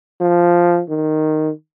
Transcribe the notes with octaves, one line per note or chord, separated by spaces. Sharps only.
F3
D#3